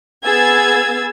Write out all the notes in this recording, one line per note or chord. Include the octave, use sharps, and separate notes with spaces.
B3 G#4 E6 G#6 A6